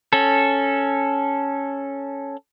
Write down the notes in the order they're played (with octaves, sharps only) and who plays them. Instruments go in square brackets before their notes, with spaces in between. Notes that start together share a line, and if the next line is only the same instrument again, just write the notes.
[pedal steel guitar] C#4 A4